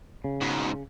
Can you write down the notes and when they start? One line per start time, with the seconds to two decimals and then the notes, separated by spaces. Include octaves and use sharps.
0.24 C#3
0.41 G#2 B2